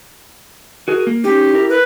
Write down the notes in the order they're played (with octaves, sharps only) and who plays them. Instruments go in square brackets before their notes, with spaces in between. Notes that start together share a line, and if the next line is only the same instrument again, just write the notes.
[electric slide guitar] F#4 G#4 A#4
A#3
[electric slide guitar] C#4 D#4 [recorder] G4
[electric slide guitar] E4 A#4
[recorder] B4